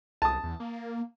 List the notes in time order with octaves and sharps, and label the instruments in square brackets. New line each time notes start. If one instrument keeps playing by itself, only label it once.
[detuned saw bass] C2 [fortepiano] A5 D#6
[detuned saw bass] E2
A#3